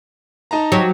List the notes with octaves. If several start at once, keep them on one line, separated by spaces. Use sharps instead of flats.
D#4 A5 A#5
F#3 G4 C#5